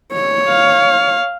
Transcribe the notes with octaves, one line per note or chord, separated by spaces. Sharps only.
C#5
F5